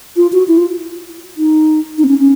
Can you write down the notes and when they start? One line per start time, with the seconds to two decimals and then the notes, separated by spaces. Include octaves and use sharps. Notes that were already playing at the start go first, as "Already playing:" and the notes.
0.16 F4
0.33 F#4
0.48 E4
0.58 F4
1.37 D#4
1.98 D#4
2.04 C4
2.08 C#4
2.19 C#4